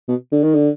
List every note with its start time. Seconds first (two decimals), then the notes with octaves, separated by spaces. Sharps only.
0.08 B2
0.32 D3
0.43 D#3
0.54 D3